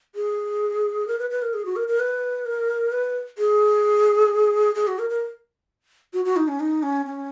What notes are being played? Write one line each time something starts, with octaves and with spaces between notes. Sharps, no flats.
G#4
A#4
B4
B4
A#4
G#4
F#4
A#4
A#4
B4
A#4
B4
G#4
G#4
F#4
A#4
A#4
F#4
F#4
D#4
C#4
D#4
C#4
C#4